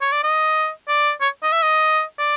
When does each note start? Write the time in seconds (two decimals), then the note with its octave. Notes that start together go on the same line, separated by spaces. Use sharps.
0.01 C#5
0.13 D5
0.24 D#5
0.88 D5
1.21 C#5
1.43 D#5
1.52 E5
1.63 D#5
2.19 D5